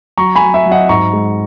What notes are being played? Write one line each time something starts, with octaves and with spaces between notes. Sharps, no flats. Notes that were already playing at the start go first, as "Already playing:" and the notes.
F#3 A#5 C#6
G#5 B5
F#3
E5 G#5
F#3
D#5 F#5
G#2 A#5 C#6
G#3